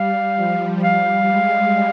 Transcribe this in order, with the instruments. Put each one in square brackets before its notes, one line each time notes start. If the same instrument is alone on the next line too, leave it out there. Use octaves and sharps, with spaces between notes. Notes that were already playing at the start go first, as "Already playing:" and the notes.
Already playing: [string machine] G3 [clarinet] F5
[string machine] F3
[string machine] G3 [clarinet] F5
[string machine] G#3